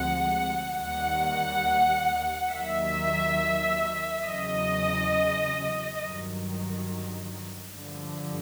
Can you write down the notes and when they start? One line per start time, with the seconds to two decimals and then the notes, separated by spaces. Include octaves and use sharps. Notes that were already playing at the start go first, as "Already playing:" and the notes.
Already playing: D2 C3 F3 G#3 F#5
0.77 D#2 D#3 G3 F#5
2.51 D#2 D#3 F#3 E5
4.24 E2 C#3 F#3 D#5
5.99 G2 D#3 F#3
7.73 G2 D3 F3